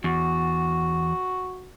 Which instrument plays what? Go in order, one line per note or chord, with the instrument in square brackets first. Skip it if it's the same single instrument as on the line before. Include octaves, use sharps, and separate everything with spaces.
[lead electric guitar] E2 [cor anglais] F#4